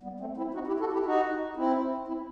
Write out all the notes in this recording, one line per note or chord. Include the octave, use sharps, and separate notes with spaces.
G3 B3
A3 C4
C4 E4
D#4 F#4
E4 G4
F#4 A4
E4 G4
D#4 F#4
C4 E4
C4 E4